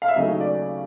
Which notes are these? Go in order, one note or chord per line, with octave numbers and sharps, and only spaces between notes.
F5
E5
D#2 C#3 F#3 A3 C#4 D#5
D5